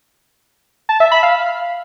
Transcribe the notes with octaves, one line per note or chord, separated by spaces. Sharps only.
A5
E5
B5
F5